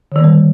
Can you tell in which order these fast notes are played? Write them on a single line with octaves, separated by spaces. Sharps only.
D3 D#3 A#3 G3